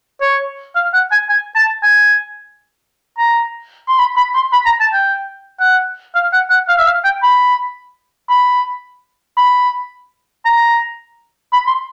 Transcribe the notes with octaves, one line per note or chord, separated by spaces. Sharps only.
C#5
F5
F#5
G#5
G#5
A5
G#5
A#5
C6
B5
B5
C6
B5
A#5
A5
G5
F#5
F5
F#5
F#5
F5
E5
F5
G5
B5
B5
B5
A#5
B5
C6